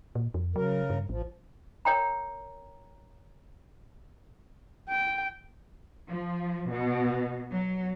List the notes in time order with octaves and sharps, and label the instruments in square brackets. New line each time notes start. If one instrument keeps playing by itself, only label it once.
[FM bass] A#2
F2
[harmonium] C#3 A#4 [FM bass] F#3
[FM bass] G2
[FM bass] A1 [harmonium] F3
[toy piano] A#4 C#5 G5 A#5
[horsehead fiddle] G5
[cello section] F3
B2
F#3